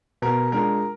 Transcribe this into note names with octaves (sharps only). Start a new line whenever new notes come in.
B2 A#4
G#3 D4 F4 A#4